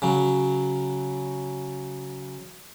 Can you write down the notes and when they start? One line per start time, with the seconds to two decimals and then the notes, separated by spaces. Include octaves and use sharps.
0.02 C#3 F#3